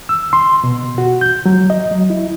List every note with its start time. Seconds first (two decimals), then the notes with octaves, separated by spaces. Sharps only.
0.09 E6
0.33 C6
0.64 B2
0.98 F#4
1.21 G6
1.46 F#3
1.70 D#5
1.91 F#3
2.10 E4